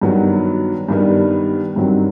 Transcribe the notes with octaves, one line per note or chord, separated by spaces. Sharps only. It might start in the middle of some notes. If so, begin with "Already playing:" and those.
G2 D#3 F#3 B3 F#4
G2 D#3 G3 B3
G2 D#3 F#3 C4 F#4